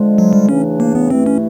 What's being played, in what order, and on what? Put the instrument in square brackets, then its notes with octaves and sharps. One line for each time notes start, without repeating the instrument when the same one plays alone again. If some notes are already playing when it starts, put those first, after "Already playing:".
Already playing: [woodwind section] D3 F3 G#3
[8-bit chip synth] F#3
G3
[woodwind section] E2 C#3 E3 A3 D4 [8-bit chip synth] C#4
[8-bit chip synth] A#3
B3
[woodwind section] G2 E3 A3 [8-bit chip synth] C4
[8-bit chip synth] C#4